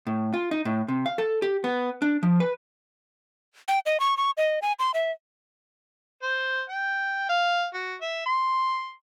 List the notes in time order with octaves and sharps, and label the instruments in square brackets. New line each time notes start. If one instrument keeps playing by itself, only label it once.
[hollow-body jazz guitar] A2
F4
D#4
A2
C3
F5
A4
G4
B3
D4
F3
B4
[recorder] G5
D#5
C#6
C#6
D#5
G#5
C6
E5
[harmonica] C5
G5
F5
F#4
E5
C6